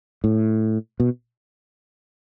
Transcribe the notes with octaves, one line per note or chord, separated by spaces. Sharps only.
A2
B2